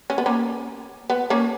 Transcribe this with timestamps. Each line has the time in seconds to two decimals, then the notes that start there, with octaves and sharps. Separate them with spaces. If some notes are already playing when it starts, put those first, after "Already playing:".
0.10 C#4
0.18 B3
0.26 A#3 C#4
1.10 B3
1.30 A#3 C#4